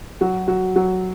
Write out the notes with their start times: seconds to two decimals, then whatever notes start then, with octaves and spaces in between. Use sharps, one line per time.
0.21 F#3 F#4
0.48 F#3 F#4
0.76 F#3 F#4